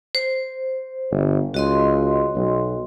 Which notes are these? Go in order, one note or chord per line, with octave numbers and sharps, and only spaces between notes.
C5
G1
C#2 F#4 D#5 C6
B1